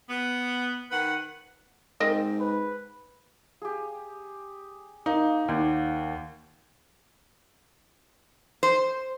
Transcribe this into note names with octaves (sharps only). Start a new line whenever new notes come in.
B3
D#3 B4 F#5
G#2 C4 A#4 D#5
B4
G4 G#4
A#3 D#4
D#2 D5 F#5 G5
C5